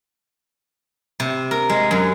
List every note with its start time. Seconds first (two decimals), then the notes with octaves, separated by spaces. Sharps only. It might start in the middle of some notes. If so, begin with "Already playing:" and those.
1.20 C3
1.51 A#4
1.69 G#3
1.91 F#2